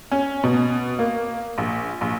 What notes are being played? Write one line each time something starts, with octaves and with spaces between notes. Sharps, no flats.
C#4
B2
A#3
A#1
A#1